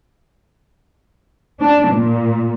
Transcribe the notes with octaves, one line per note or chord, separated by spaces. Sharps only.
D4
A#2